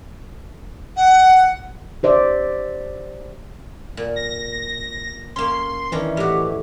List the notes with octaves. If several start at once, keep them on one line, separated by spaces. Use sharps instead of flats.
F#5
G4 C5 D5 E5
A#2
A#6
A#3 C#4 C6
D#3 E3 C#4 D4
A2 F#4 G4